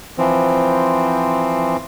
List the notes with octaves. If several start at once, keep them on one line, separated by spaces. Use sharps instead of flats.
E3 F3 C4